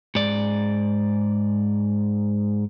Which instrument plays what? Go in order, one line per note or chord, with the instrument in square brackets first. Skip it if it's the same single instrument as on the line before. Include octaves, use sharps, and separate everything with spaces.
[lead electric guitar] G#2 D5